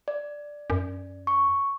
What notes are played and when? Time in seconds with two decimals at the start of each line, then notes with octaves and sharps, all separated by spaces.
0.08 D5
0.70 F#2
1.27 C#6